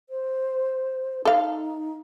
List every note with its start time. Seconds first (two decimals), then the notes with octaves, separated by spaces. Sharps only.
0.10 C5
1.25 D#4 A4 F5